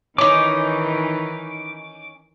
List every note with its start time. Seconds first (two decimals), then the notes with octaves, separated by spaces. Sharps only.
0.18 D#3 E3 C#4 D#4 D6